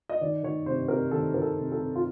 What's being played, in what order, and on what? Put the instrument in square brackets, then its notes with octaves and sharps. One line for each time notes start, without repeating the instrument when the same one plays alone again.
[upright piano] D#5
D#3 D5
D#3 C#5
C3 C5
C3 A#4
D#3 A4
D#3 A#4
A4
C3
A4
C3
F4